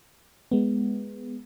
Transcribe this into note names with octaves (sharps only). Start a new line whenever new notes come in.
G#3 B3